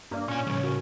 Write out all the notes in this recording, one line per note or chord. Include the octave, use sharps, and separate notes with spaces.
G2 A#3 D4 D5
A#2 C#4 G#5
A2 C#3 F3 G3
F#4 A#4